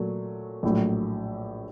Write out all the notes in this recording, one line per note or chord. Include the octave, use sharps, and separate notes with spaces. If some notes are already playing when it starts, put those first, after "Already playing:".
Already playing: A#2 F#3 A3
A#1 A2 F#3